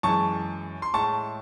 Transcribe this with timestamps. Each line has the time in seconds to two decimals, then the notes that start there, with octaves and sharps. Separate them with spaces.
0.03 F#2 E3 G#3 A5 C#6
0.82 C6
0.94 A2 G#3 A5 C#6